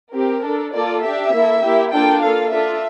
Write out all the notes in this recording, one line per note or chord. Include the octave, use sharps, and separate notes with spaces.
C4 G4 A#4
D4 A4
A#3 F4 A4 D5
D4 G4 E5
A#3 E4 A4
A#3 E4 G4
A#3 D4 F4 A4 G5
A#3 F4 A4 F5
D4 F4 A4 E5